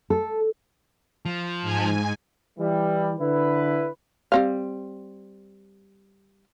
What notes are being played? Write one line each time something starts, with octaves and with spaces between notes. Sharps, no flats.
A4
F3
G#2 G#5
E3 G3
D3 E4 B4
G3 C4 F5